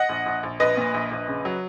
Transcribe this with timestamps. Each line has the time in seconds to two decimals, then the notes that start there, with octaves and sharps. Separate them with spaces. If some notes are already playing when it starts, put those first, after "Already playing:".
Already playing: D#5 F#5
0.09 A#1
0.26 A#1
0.43 A#1
0.60 A#1 B4 D#5
0.77 A#2
0.94 A#1
1.11 A#1
1.28 C#3
1.45 F#3